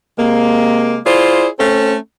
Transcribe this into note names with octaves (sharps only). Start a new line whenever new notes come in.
C3 G#3 A#3
E4 F4 G#4 C5 D5
A3 C4 C#4 A4